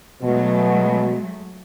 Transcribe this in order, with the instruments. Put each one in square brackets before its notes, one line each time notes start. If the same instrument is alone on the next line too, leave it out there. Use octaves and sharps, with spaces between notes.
[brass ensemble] B2 [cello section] F#3 G#3 A3